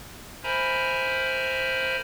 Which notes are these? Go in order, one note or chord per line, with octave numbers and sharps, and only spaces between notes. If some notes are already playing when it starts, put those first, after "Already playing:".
A#4 C5 E5 G#5 A#5 B5